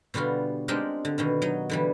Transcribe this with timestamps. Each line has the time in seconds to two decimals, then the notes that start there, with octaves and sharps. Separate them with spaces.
0.14 B2 D3 G3 F4 F#4
0.68 G#3 C4 D4 D#4 G4 A#4
1.05 D3
1.18 B2 D3 D#3
1.42 F#3 D#4
1.70 D3 E3 G3